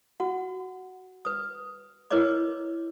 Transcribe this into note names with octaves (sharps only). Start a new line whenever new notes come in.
F#4 F#5
B4 D#6
E4 A#4 B4 C#5 D#5 D6